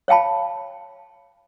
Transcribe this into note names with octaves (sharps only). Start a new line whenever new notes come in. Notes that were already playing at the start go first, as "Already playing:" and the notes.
C#5 F5 G5 A5 B5